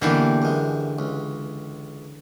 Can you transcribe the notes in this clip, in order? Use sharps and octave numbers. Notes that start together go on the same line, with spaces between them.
B2 D3 E3 G3 A#3 G4
F#2 G#3
C#2